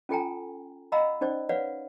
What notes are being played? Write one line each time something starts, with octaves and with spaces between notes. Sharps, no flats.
C#4 F4 A4 G5 G#5 A#5
D#5 F5 F#5 A#5 B5 E6
C#4 D#4 C5 D5
B4 C#5 D5 F5 F#5